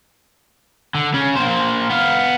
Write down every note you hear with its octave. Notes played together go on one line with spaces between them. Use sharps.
D3
C#3 C#4
A#3 C5
B3 F5